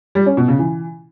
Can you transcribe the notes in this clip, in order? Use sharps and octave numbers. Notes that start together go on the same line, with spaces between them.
G3
C#4
B2
C#3
E3